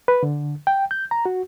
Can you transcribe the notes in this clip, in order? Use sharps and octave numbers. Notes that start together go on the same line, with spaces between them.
B4
D3
G5
G6
A#5
F#4